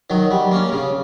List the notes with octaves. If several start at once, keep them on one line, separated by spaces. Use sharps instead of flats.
D#3 F#3
G3
A#3 C#4
C#3